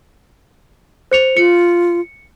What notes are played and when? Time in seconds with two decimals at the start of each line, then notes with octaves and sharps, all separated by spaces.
1.11 C5 C#7 F7
1.37 F4 C#7